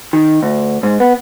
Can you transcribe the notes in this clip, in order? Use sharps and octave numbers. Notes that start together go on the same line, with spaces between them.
D#3
D2
G#2
B3